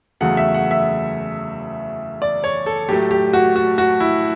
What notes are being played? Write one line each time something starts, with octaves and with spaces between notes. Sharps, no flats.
E2 C#3 F#3 A3 F#5
E5
F#5
E5
D5
C#5
A4
A2 F#3 A3 G4
G4
F#4
F#4
F#4
E4